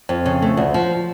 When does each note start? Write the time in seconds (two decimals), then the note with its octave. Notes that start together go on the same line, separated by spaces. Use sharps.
0.09 F2
0.26 C#3
0.42 A3
0.57 D2
0.74 F3